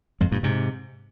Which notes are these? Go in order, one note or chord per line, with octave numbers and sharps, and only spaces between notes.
F2 G#2
G2 A#2
G#2 C3